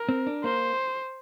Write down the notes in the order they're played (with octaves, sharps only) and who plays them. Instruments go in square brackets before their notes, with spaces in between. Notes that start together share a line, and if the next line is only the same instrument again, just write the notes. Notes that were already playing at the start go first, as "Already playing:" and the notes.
Already playing: [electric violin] A#4
[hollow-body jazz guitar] C4
D4
[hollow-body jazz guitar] A#3 [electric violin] C5